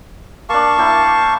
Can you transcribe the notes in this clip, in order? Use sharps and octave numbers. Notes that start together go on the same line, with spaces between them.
A#3 D4 F5 A5 C#6
A#3 E4 G5